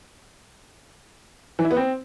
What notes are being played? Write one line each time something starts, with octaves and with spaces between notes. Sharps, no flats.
E3
E4
B3
C4